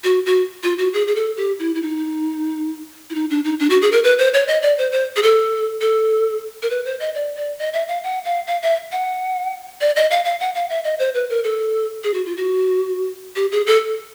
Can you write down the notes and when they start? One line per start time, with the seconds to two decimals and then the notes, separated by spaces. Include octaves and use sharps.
0.04 F#4
0.26 F#4
0.63 F4
0.78 F#4
0.93 G#4
1.07 G#4
1.16 A4
1.37 G4
1.59 E4
1.75 E4
1.82 D#4
3.10 E4
3.15 D#4
3.30 D4
3.44 D#4
3.59 D4
3.70 F#4
3.82 G#4
3.92 A#4
4.04 B4
4.18 C5
4.34 C#5
4.48 D#5
4.62 D5
4.78 C5
4.92 C5
5.16 G#4
5.23 A4
5.81 A4
6.62 A#4
6.70 B4
6.85 C5
7.00 D#5
7.15 D5
7.36 D5
7.59 D#5
7.73 E5
7.88 F5
8.04 F#5
8.25 F5
8.47 F5
8.63 E5
8.92 F#5
9.81 D5
9.96 D#5
10.11 F5
10.25 F5
10.40 F#5
10.55 F5
10.70 E5
10.84 D#5
10.99 C5
11.14 B4
11.30 A#4
11.44 A4
12.04 G#4
12.14 F#4
12.26 F4
12.37 F#4
13.36 G4
13.52 G#4
13.67 A4